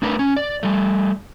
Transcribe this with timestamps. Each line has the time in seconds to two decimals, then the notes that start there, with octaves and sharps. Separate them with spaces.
0.02 A3 D4 A#4 B4
0.19 C#4
0.36 D5
0.63 G3 A3